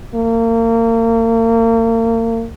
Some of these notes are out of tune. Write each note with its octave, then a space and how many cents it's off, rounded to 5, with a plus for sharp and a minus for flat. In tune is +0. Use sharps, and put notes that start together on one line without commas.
A#3 -35